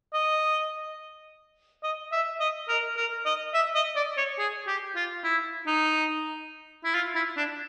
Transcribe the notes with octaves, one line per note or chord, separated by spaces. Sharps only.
D#5
D#5
E5
D#5
A#4
A#4
D#5
E5
D#5
D5
C#5
G#4
G4
F4
E4
D#4
E4
F4
E4
D4